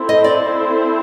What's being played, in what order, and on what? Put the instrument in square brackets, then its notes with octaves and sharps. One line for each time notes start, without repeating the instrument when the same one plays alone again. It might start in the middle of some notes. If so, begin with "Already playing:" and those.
Already playing: [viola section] C4 E4 A4 C5
[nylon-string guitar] D#5
D5